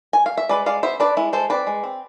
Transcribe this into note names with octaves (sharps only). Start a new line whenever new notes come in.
G#5
F5
E5
G#3 B4 D5
G#3 D5 F5
B3 C5 E5
D4 B4 D5
G#3 E4
G#3 A4 C5
C4 B4 D5
G#3
C4